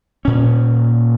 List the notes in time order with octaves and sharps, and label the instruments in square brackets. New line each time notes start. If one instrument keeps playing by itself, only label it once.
[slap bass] A#2 C#4